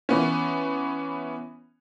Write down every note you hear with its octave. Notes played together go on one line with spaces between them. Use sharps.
E3 B3 C#4